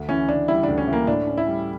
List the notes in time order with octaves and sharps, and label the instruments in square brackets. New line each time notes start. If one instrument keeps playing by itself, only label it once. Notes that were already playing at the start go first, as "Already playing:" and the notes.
Already playing: [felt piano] D2
[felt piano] E3 [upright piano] C#4
[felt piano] C#3 [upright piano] D4
[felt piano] G3 [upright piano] E4
[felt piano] D2 [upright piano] D4
[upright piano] C#4
[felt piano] E3
[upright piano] A#3
[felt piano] A2 [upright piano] D4
[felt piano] C#4
[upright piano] E4
[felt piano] G3